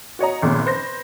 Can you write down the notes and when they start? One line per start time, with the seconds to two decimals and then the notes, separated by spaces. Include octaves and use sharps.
0.19 F#4 C#5 D#5 A#5
0.42 G#1 A#2 C#3
0.66 B4 C5 A#6